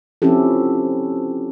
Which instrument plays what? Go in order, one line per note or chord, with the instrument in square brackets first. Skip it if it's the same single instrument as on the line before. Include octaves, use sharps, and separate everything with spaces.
[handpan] F3 C4 C#4 E4 G4 A4